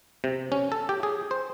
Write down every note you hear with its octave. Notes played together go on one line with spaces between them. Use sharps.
C3
C#4
A4
G4
G#4
C5